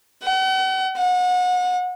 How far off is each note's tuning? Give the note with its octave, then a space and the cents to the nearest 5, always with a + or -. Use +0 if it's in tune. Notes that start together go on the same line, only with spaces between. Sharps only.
F#5 +45
F#5 -30